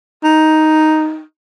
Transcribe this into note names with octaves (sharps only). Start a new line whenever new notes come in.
D#4